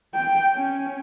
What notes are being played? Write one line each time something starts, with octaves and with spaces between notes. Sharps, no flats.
G5
C#4